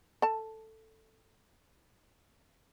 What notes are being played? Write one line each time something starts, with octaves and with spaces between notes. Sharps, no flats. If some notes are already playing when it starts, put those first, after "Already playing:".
A4 A5